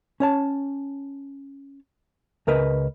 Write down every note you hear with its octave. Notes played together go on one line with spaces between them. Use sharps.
C#4 C#5 A5
C#2 C#3 A#4 B4 D#5 E5